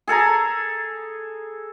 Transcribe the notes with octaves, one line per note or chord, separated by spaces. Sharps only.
G#4 A4 G#5 A#5